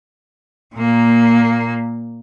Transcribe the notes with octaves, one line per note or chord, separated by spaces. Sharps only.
A#2 A#3